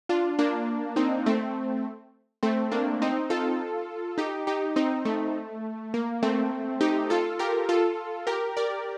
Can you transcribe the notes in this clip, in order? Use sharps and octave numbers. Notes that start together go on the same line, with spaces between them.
D4 F4
A#3 D4
C4 D#4
A3 C4
A3 C4
A#3 D4
C4 D#4
F4 A4
D#4 G4
D#4 G4
C4 D#4
A3
A#3
A3 C4
D#4 G4
F4 A4
G4 A#4
F4 A4
G4 A#4
A#4 D5